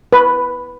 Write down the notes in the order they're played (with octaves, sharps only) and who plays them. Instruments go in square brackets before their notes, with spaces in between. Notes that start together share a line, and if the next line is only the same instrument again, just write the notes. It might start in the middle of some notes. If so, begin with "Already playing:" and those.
[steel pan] B4